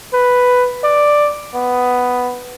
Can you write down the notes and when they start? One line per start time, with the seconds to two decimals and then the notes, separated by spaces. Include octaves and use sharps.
0.13 B4
0.84 D5
1.54 B3